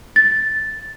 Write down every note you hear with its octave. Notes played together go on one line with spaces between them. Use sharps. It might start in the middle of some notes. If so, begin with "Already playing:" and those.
A6